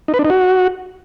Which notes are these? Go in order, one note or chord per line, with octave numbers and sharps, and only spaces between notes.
D#4
B4
D4
D#4
F#4